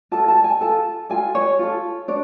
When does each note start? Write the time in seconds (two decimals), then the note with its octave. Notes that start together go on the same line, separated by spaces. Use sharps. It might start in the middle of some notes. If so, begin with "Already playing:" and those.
0.12 F4 A4 A5
0.28 A5
0.44 G#5
0.61 F4 A4 A5
1.10 F4 A4 G#5
1.35 C#5
1.59 F4 A4
2.08 D4 C#5